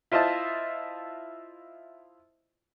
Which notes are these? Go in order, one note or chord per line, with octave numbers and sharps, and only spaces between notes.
E4 F4 C5 D#5 A5